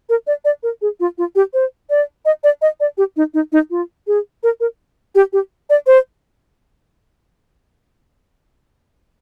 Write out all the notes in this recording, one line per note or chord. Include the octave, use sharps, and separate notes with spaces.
A#4
D5
D5
A#4
G#4
F4
F4
G4
C5
D5
D#5
D5
D#5
D5
G4
D#4
D#4
D#4
F4
G#4
A#4
A#4
G4
G4
D5
C5